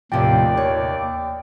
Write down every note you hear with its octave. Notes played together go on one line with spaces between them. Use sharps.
D#2 A2 C3 F3 D5 G5
C#5